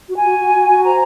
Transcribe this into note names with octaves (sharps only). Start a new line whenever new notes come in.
F#4
G#5
F#4
F#4
F#4
F#4
C5 A#5